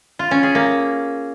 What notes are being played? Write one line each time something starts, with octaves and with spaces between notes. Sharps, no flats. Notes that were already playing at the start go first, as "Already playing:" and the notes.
F4
C#4
G#4
A#3